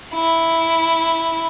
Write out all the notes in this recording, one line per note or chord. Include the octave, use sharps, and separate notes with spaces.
E4